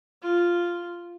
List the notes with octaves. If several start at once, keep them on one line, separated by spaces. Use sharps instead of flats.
F4